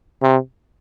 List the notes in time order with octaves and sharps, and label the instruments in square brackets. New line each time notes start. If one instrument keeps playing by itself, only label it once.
[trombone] C3